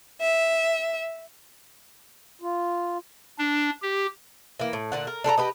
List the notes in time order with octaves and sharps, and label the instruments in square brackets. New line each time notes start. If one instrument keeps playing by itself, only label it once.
[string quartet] E5
[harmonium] F4
[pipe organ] D4
G4
[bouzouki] E3 A#3
A2
A#2 D3 F#5
A#4
D4 A4 B4 A#5
G4 B4 D#5